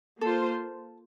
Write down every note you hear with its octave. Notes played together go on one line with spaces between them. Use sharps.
A#3 F4 A4 C5